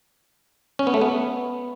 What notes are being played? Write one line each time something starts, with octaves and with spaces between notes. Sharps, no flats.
C#4
B3
A3
B3